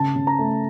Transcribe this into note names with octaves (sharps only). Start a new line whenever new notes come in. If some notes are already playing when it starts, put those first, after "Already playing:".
Already playing: C#3 A5
C#3
A#5
A3